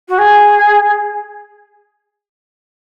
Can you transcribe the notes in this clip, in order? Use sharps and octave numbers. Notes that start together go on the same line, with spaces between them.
F#4
G#4